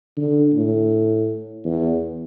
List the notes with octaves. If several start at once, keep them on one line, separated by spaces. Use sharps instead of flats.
D3
A2
E2